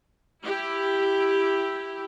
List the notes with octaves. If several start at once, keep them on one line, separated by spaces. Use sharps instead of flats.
E4 G4